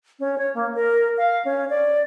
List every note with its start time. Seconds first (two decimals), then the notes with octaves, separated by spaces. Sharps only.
0.19 C#4
0.38 C#5
0.54 A#3
0.75 A#4
1.17 F5
1.45 C#4
1.70 D5